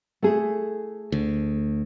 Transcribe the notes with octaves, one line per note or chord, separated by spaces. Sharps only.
A3 E4 G#4
D2